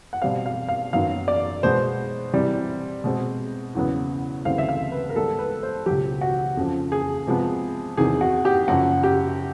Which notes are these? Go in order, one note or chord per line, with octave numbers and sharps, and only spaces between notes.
F#5
B2 G3 C4 F5
F5
F5
F#2 D#3 F#3 B3 F5
D5
B2 G#3 B3 C5
C3 E3 G3
B2 G#3 C4
E2 C#3 F#3 B3
D2 C#3 E3 G3 C4 F5
E5
F5
B4
A#4
G#2 D#3 G3 B3 A4
B4
C5
C#2 B2 F#3 G4
F#4
F2 C#3 F3
G#4
C3 F3 G#3 B3
E2 C3 D#3 G#4
F#4
G4
F#2 C#3 F3 F#4
G4